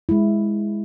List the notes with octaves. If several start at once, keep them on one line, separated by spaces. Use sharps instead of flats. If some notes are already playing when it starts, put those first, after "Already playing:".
G#3 E4